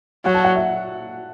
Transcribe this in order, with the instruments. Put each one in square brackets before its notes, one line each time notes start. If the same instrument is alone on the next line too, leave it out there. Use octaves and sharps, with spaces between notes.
[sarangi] F#3 [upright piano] F#5
[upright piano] A5
F#5
E5